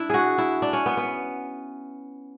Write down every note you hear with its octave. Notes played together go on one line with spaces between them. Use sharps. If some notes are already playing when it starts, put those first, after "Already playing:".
Already playing: D4 E4
F#4 G#4
E4
D4
C#4
B3
B3